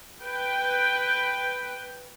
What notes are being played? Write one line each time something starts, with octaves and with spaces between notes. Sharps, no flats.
B4 G5